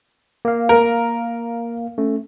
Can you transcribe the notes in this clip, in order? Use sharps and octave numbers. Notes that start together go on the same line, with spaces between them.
A#3 F5
A#4
A3 C#4